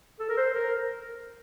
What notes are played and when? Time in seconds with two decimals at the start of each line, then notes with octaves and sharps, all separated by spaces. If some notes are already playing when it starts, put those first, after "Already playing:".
0.19 A4
0.29 A#4
0.37 C5
0.54 A#4